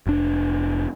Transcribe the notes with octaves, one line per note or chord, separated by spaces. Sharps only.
F1 D4